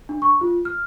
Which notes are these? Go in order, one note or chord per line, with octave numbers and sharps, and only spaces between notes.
D4
C#6
F4
F6